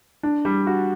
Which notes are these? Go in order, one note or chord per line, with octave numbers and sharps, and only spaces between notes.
D4
G3
F#4